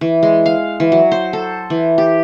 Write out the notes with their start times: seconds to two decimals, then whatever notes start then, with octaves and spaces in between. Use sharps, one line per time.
0.01 E3
0.23 G#3
0.46 F5
0.80 E3
0.92 F#3
1.12 C5
1.33 A4
1.70 E3
1.98 G4